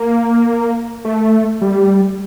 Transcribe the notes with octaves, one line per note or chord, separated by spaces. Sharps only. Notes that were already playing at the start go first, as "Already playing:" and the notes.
Already playing: A#3
A3
G3